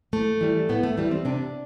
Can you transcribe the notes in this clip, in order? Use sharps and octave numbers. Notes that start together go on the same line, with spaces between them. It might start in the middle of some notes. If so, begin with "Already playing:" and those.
A2 A3
E3 G3
A2 B3
A3
E3 G3
C4
C3 D4